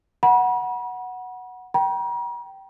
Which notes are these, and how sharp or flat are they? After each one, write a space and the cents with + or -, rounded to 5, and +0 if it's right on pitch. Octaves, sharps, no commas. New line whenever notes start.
F#5 +0 B5 -40
G5 -20 A#5 +45